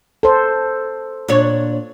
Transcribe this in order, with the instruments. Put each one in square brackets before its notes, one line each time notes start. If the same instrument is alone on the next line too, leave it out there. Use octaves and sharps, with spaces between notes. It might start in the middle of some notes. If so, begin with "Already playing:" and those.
[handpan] A4 C5
[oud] A#2 D4 C#5